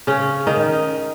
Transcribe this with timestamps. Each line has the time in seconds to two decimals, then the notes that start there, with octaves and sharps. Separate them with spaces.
0.07 C#3 C#4
0.47 D#3 D#4